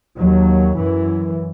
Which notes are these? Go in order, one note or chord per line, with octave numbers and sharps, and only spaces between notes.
D#2 F#3
F#2 E3